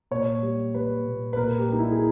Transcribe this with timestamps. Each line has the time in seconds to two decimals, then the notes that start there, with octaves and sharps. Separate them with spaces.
0.11 A#2 C#5
0.43 G3
0.74 G3 B4
1.05 A#2
1.33 B4
1.36 A#2 A#4
1.58 G4
1.68 G3 D#4
1.78 E4
1.92 G#4